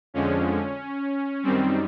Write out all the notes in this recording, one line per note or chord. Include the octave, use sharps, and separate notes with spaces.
F2 D3 F3 G#3 C#4
F#2 D#3 G3 C4